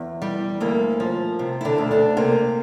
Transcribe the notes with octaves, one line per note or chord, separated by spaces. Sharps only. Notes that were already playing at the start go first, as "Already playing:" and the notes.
Already playing: E2
G3
D2 A#3
F3
C3
E4
D3 D4
D2
D3 D4
C3 A#3